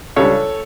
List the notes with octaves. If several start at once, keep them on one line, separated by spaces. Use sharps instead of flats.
C#2 C#3 G3 D4 A4 C#5